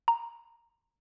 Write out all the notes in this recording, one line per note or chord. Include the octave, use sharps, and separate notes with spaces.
A#5